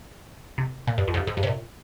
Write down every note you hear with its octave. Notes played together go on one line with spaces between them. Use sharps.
C3
A#2
G2
F2
G#2
G2
G#2
G2
C3
A#2